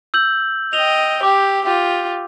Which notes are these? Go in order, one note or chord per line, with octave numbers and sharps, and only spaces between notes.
E6 G6 F#7
D#5 G5 F7 G7
G4 D6
F4 G4